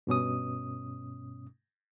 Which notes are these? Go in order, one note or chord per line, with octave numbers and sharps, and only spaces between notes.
G2 B2 C#4 D#6